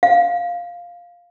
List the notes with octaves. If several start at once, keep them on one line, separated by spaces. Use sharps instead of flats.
F5